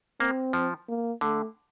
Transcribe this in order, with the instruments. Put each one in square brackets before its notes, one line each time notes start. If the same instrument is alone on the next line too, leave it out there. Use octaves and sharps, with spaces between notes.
[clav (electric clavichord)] A#3 [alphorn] C4
[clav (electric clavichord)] F3
[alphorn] A#3
[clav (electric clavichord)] D3 [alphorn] A3